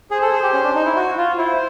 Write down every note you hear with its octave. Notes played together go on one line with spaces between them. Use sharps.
G#4 C5
A4
G#4
G4
C#4
D4
D#4
E4
F#4
F4
E4 C5